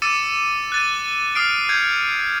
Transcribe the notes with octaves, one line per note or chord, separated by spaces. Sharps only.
D6 E6 A6 C#7 D#7 E7
F#6 A6 D#7
D#6 F6 C7 D7
G6 G#6 C#7